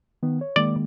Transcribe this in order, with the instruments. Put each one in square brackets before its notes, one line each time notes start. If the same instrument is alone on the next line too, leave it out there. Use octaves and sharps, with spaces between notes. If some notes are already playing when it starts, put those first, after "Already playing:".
[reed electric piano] D#3 B3
C#5
[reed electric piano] D#3 G#3 A#3 [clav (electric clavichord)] D5